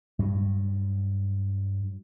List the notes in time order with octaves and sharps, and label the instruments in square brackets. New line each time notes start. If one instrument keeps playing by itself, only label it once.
[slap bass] G2 F#3